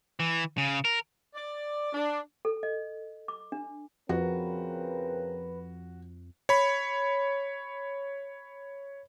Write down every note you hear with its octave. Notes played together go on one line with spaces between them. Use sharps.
E3
C#3
A#4
D5
D4
A4
D#5
D6
D4
F2 C#3 C4 F#4 A#4 B4
C#5 B5